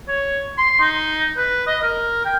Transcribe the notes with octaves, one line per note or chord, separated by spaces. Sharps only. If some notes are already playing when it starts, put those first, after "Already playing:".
C#5
C6
D#4
B4
D#5
A#4
G5